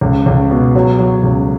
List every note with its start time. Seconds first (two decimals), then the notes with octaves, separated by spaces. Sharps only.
0.01 C#2
0.26 C#2
0.51 B2
0.75 F#3
0.99 F#3
1.23 C#2